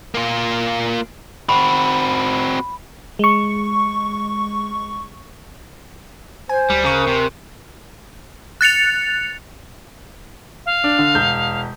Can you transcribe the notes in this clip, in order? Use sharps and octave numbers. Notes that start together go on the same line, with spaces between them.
A#3 F4
C4 F#4 B5
G#3 C#6
C5 G#5
D2 G3
C#3 A#4 C#6 F#6
C3
F#6 A6 C#7 F7
F5
D4
D3
E1 G6